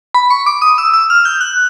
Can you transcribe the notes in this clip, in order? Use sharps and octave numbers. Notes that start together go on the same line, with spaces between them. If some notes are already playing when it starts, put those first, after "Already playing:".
B5
C#6
D6
D#6
E6
E6
F6
G6
F#6